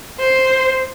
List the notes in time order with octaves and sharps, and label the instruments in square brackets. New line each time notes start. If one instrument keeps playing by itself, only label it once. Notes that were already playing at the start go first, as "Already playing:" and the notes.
[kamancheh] C5